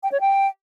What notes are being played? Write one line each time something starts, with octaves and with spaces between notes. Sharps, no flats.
G5
C#5
G5